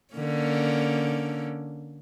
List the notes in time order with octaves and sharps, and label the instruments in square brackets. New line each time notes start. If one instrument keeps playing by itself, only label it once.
[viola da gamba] D3 A#3 C#4